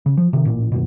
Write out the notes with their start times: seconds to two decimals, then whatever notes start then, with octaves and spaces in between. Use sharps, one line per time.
0.06 C#3
0.17 F3
0.33 C3 D#3
0.45 A1 A#2
0.72 D#1 F#2 B2